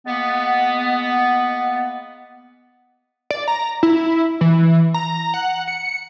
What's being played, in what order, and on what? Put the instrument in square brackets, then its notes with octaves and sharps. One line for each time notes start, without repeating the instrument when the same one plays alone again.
[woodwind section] G#3 A#3 B3
[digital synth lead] D5
A#5
E4
E3
A#5
F#5
C#7